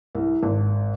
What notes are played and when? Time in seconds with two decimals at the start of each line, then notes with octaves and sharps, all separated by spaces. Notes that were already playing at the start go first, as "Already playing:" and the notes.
0.15 C2
0.43 G#1